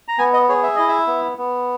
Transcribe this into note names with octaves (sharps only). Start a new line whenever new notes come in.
A#5
B3 G#5
D#5
G#4 C#5
E5
E4 D#5
E5
B3
B3